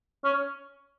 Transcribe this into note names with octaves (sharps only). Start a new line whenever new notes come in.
C#4